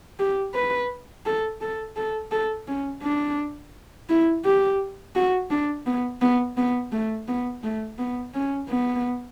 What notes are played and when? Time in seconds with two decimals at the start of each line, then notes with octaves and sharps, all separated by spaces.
0.19 G4
0.54 B4
1.26 A4
1.61 A4
1.96 A4
2.32 A4
2.68 C#4
3.03 D4
4.09 E4
4.44 G4
5.16 F#4
5.50 D4
5.86 B3
6.21 B3
6.57 B3
6.92 A3
7.28 B3
7.63 A3
7.99 B3
8.34 C#4
8.70 B3